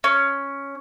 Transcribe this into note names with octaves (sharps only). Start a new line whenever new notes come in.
C#4